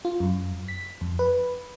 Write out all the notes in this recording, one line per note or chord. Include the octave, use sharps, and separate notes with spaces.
F4
F#2
B6
F2
B4